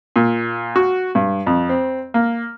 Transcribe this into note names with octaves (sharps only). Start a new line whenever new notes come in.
A#2
F#4
G2
F2
C4
A#3